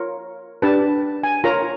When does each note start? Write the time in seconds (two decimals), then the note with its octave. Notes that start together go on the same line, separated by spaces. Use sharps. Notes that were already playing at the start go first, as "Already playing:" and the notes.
Already playing: F4 A#4 C#5
0.62 D4 G4 B4 A5
1.24 G#5
1.44 F4 A#4 C#5 A#5